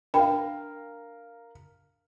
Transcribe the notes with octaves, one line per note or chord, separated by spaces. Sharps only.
D4 A#4 F5 G5 B5